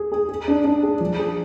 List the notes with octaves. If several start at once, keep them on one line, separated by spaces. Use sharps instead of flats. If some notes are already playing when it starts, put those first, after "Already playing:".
Already playing: G#4
G#4
G#4
D4
D4
G#4
F3
G#4